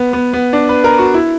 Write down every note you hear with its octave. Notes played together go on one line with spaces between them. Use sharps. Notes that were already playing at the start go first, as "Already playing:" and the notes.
Already playing: B3
B3
B3
D4
B4
A#4
F#4
E4